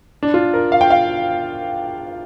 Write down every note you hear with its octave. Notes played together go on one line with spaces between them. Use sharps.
D4
F4
A#4
F5
G5
F5